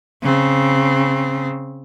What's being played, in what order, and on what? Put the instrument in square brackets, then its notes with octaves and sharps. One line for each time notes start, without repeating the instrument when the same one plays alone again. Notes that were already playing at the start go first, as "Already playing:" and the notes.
[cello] C#3 C4